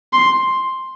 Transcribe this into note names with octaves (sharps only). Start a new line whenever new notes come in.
C6